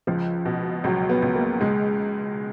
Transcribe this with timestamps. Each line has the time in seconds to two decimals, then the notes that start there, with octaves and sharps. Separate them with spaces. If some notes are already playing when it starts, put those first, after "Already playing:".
0.07 C#2 F3
0.45 B2
0.84 C#2 F#3
1.09 B3
1.22 C#2
1.35 A#3
1.61 C#2 G#3